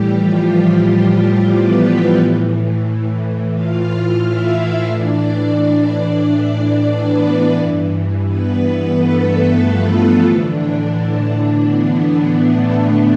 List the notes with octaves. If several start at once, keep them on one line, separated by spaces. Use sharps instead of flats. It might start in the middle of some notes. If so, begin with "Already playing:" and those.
Already playing: A2 E3 G3 G4
F3 F4
B3 B4
A2 E3
F4 F5
E4 E5
A2 E3 D4 D5
B3 B4
G2 E3
B3 B4
A3 A4
F3 F4
A2 D3 E3 D4
B3
A3